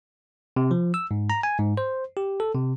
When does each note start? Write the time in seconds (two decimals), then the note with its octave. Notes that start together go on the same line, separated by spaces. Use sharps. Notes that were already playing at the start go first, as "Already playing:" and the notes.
0.56 C3
0.71 F3
0.94 E6
1.11 G#2
1.30 A#5
1.43 G#5
1.59 G#2
1.77 C5
2.17 G4
2.40 A4
2.54 C3